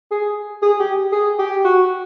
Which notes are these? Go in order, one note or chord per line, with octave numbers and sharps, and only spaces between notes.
G#4
G#4
G4
G#4
G4
F#4